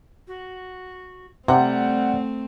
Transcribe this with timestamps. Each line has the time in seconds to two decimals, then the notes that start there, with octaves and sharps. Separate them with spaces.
0.28 F#4
1.48 C3 G3 A3 C4 F#5